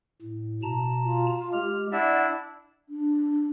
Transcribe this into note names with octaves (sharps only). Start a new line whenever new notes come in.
A2
B2 A5 A#5
F4
G#3 G4 F6
D4 E4 D5 E5 F#5
D4